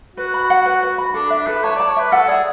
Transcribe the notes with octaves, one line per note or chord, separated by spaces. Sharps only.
F#4 B4
B5
F#5
B4
B4
B5
D4 A4
D4 E5
A4 B4
C#5 A5
D5 A5
C#5
B4 E5
A4 F#5
G#4 D5